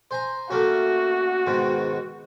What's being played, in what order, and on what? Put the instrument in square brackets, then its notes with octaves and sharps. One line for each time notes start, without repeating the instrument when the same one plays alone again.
[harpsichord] C5 G#5 A#5
[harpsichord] A3 A#3 C#4 [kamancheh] F#4
[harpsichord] G#2 B2 D#3